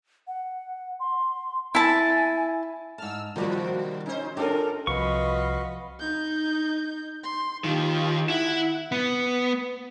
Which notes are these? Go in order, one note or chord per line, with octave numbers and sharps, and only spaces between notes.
F#5
C6
E4 G#5 A5
G#2 A5 E6 F6
B2 D#3 F3 G3 A#3 F#4
C#4 D#4 C5
D4 F4 G4 A4 A#4
C2 F3 F#4 B4 D#5 F5 B5 C#6
D#4 G6
C6
D#2 D#3 F4 G4
E4 F#5
B3